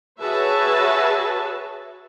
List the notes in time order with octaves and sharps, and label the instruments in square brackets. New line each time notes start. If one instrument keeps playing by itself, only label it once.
[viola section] F#4 G#4 B4 C#5 E5 A5